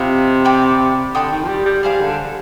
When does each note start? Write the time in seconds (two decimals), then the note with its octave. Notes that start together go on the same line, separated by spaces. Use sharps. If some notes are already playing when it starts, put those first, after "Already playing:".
Already playing: C3 F4 B4 D#5 G5
0.45 D5 G5 B5
1.14 D3 D5 G5 C6 D#6
1.32 D#3
1.43 F3
1.48 G3
1.65 G3
1.83 G3 G#4 C5 F5
2.01 D3